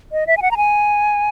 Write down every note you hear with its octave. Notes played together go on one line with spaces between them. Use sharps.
D#5
E5
G#5
F#5
A#5
G#5